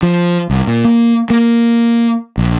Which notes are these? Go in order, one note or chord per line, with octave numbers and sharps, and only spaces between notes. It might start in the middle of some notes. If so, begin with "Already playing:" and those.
F3
C2
A#2
A#3
A#3
A#1